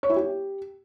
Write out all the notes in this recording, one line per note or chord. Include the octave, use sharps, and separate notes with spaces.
C#5
E4
G4